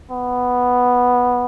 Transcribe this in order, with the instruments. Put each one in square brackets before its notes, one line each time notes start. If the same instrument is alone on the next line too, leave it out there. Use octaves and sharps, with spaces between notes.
[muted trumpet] B3